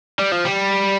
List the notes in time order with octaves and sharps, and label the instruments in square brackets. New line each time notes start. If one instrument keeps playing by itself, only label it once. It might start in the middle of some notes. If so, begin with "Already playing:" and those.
[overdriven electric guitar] G3
F3
G3